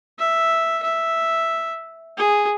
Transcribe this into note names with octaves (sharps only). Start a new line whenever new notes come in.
E5
E5
G#4